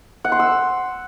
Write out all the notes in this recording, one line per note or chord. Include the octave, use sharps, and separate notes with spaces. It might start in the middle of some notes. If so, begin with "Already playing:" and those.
F#5
C6
E6